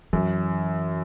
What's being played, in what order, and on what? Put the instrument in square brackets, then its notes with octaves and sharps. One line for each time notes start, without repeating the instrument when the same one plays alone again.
[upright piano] F#2 [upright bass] E3